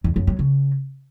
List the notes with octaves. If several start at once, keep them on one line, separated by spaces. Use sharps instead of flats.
E2
F#2
F#3
C#3